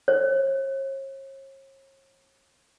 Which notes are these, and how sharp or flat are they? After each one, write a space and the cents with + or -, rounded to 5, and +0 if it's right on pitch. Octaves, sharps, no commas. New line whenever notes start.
C#5 -40